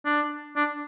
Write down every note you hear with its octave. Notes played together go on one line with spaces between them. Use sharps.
D4
D4